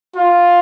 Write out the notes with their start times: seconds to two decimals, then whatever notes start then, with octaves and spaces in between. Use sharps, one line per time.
0.15 F4